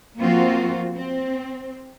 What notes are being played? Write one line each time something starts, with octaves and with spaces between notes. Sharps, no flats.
F3 A#3 C4 F4 F#4
C4